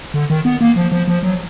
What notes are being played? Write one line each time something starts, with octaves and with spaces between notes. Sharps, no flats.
D3
D#3
B3
A#3
F3
F3
F3
F#3